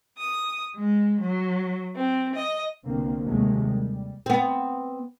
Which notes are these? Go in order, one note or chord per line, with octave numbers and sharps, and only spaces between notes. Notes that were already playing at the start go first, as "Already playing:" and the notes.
D#6
G#3
F#3
C4
D#5
C2 B2 D3 A#3 C4
D#2 C3 F#3 G#3 A3
G3
B3 C4